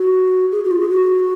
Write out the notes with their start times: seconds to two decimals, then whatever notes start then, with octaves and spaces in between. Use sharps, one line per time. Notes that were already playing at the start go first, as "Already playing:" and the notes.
Already playing: F#4
0.52 G#4
0.65 F#4
0.71 F4
0.80 G#4
0.89 F#4